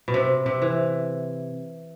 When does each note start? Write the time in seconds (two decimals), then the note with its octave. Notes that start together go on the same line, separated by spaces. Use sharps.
0.08 B2
0.14 C3
0.46 C3
0.62 E3